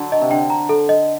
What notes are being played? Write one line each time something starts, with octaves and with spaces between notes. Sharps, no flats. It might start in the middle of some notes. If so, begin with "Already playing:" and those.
Already playing: D3 F#3
D#5
C3
D3 G5
A#5
A4
D#5